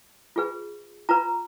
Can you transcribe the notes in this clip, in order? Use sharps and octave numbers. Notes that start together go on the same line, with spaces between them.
F4 G#4 B4
F4 B4 A#5